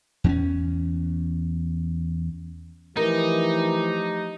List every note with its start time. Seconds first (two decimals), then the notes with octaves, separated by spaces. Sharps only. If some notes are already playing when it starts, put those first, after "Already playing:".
0.24 E2 C4 C#4
2.97 E3 F3 A3 D#4 G4 A#4